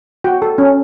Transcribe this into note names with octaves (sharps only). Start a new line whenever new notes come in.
F#4 G5
A4
C#4